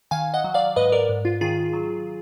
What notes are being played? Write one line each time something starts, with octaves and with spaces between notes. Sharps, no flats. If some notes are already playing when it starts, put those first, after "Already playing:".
D#3 F5 G#5
D#5 F#5
F#3
D5 F5
G#2 B4 D#5
A#4 D5
G#2
F4
D#3 F4 G#4
F#3